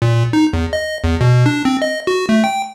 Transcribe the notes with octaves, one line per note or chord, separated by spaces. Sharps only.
A#2
D#4
E2
D#5
E2
B2
D4
C4
D#5
F#4
A3
G5